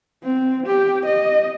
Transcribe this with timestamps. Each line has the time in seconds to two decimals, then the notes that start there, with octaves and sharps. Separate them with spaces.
0.24 C4
0.67 G4
1.06 D#5